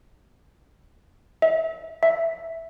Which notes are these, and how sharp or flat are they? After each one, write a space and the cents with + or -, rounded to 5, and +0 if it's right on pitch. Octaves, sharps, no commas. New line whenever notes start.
E5 -35
E5 +0